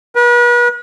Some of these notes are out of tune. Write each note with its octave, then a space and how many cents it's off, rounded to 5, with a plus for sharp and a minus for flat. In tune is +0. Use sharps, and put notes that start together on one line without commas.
B4 -40